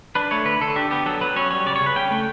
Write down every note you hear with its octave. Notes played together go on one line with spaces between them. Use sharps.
D4 B4
A3 C#5
D3 B4
D3 A4
D4 G4
B3 G4
F#3 A4
F#3 B4
C#4 C#5
G3 C#5
C#3 D5
C#5
C#3
B4
C#4 G5
A3